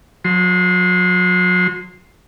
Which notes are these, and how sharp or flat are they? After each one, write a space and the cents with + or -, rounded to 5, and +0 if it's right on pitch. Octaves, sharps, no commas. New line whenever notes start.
F#3 -35 C6 +0